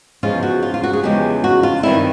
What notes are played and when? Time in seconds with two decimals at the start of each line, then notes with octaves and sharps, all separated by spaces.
0.23 E2 C#3 F3 G#3 C#4 F4
0.43 F#4
0.63 F4
0.74 F4
0.84 F#4
0.93 G#4
1.03 E2 C#3 F3 G#3 C#4 G4
1.44 F#4
1.63 F4
1.83 G2 D#3 G3 C4 D#4 E4